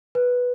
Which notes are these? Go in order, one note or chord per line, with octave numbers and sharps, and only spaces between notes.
B4